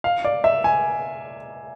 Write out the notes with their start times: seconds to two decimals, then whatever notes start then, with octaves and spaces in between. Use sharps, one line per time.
0.04 F5
0.24 D5
0.44 E5
0.64 G#5